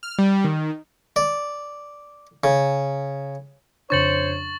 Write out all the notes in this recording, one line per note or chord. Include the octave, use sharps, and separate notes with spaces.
F6
G3
D#3
D5
C#3
F2 C#3 D4 C5 C#5 C#6 A6 F#7